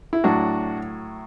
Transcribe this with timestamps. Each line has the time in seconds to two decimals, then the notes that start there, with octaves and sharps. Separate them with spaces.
0.13 E4
0.24 A2 F#3 D4 F#4